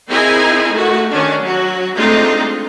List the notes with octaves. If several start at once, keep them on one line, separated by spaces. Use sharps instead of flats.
C4 D#4 E4 G#4 A#4 G#5
A3 F#4
D#3 C#4 D4
F#3 F#4
G#3 A3 C4 D4 D#4 F4